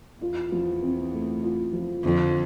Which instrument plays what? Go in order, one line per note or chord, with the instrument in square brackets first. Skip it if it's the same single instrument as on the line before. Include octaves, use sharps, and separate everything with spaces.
[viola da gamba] E2 [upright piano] F4
[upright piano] F3
C4
A3
F4
F3
[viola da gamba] F2 [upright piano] D3